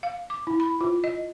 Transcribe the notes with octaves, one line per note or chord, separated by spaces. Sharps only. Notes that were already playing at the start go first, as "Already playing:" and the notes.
F5
D6
E4
B5
F4
D#5